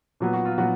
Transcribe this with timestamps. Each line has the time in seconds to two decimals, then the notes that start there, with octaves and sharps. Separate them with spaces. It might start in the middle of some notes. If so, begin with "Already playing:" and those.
0.20 A#2 F#3 B3
0.33 F#4
0.45 F4
0.57 A#2 F#3 B3 F#4